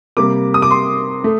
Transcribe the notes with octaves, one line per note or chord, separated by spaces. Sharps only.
C3 G3 A#3 D6
D#6
D6
C6
A3